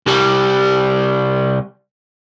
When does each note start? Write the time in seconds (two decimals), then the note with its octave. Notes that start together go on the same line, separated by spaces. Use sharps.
0.06 C2 G3